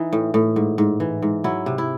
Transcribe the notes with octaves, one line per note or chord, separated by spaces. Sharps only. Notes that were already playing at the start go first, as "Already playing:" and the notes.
Already playing: E3 D#4
A2
A2
G#2
G#2
E3
G#2
F#3 E4
C3
E4